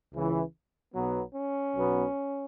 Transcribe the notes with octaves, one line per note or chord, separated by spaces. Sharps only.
C#2 C#3 E3
B1 B2 F#3 B3
C#4
B1 B2 F#3 B3